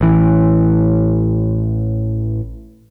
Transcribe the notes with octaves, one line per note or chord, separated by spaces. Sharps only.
A1 E3